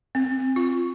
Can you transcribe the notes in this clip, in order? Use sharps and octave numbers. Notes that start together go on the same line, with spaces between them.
C4
F4